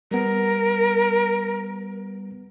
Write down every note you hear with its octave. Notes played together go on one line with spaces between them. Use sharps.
G3 B3 A#4